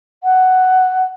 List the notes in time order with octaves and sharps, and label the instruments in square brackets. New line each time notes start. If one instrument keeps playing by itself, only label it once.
[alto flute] F#5